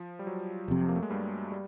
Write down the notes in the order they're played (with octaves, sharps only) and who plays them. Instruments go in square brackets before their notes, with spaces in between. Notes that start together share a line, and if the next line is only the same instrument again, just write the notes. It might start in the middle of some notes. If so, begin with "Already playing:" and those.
Already playing: [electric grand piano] F3
G3
F#3
[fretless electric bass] F1 F2 C3
[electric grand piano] A#3
A3
G#3
G2 G3
G3